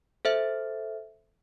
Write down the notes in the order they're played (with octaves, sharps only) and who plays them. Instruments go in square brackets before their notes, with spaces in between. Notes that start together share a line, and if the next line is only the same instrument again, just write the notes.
[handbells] A4 C5 E5